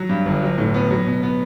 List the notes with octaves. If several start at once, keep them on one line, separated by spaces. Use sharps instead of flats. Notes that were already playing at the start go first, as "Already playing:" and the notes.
Already playing: F#3
G2
G1
F#3
A2
B3
F#3
B2
B3